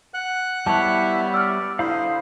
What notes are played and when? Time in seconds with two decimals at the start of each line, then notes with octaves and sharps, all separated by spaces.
0.14 F#5 F#6
0.66 G3 B3 E4 C#5 A5
1.34 D5 E6 F6
1.79 D3 E4 C5 F5 B5 D#6